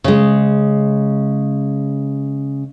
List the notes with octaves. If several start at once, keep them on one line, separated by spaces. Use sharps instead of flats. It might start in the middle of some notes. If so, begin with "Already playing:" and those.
C#3 G#3